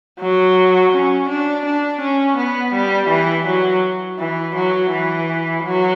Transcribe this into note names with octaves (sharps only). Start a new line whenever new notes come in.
F#3
C#4
D4
D4
C#4
B3
G3
E3
F#3
E3
F#3
E3
F#3